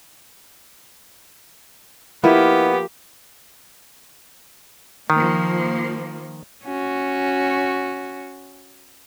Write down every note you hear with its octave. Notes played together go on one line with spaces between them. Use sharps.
F3 A#3 B3 E4 G4 A#4
D#3 F3 A#3
C#4 F#4